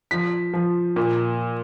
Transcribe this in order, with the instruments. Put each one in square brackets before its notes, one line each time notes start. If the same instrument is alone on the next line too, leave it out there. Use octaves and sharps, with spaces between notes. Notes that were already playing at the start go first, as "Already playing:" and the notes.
[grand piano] F3 B6
F3
A#2